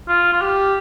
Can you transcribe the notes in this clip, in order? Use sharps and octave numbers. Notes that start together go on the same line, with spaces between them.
F4
F4
G4